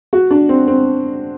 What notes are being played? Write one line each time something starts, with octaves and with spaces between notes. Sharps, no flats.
F#4
D4
C4
C4